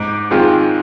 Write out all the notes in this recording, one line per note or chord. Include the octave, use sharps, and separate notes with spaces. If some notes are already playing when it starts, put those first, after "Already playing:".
Already playing: G#2 D6
D#3 G#3 C4 F4